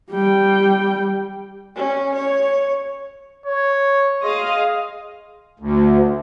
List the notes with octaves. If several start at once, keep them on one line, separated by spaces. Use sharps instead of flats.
G3 G5
C#4
C#5
C#5
G#4 D#5 F5 C6
D2